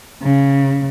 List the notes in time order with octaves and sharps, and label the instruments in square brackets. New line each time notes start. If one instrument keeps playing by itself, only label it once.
[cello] C#3